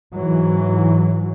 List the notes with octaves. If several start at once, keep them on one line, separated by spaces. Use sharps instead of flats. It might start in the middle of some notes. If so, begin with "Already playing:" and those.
G#2 E3 F#3